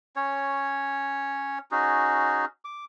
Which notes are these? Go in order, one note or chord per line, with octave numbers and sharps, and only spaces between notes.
C#4 C#5
C#4 D#4 F#4 G#4
D6